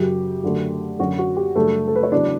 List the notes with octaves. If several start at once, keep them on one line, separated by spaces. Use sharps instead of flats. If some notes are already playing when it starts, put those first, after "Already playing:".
Already playing: F#2 C#3 F#3 G4
F#2 D3 A3
F#2 D3 F#3 C#4 F#4
F#4
G4
F#2 C#3 G3 A3 D4 A4
A4
B4
C#5
E2 C#3 F#3 D4 D5